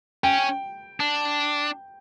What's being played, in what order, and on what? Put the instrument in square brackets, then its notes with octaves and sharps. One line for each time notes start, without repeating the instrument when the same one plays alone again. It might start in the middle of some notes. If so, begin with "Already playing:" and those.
[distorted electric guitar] C#4 [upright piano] G5
[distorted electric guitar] D4